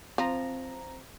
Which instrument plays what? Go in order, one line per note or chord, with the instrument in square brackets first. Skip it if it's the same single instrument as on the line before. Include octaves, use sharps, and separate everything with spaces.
[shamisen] F3 [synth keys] C4 A#5